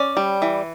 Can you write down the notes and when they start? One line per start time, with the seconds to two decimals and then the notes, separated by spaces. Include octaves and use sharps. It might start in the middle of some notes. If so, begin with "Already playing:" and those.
Already playing: C#4 D5
0.17 G3
0.42 E3